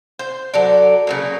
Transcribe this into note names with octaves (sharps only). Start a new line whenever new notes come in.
C5
F#3 A4 D5
C#3 F#3 A#3